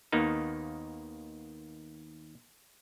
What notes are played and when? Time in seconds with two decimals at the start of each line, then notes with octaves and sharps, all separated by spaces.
0.12 D#2 D#3 A#3 B3 D#4